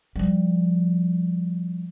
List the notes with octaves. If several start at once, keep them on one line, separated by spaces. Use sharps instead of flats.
F3 G3